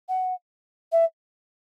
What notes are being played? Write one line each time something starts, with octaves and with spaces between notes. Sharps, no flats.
F#5
E5